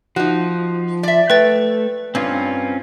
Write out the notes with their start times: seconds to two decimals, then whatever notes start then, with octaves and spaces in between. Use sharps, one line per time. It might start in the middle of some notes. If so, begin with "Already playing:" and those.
0.16 F3 D#4 F#4
1.03 D5 E5
1.30 A3 B4 G5 A6
2.15 G2 C4 C#4 F4